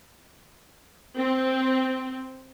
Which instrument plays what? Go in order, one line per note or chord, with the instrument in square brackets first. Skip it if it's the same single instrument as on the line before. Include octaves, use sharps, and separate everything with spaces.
[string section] C4